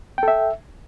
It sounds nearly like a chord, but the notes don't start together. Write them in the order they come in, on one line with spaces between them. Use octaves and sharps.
G5 A4 E5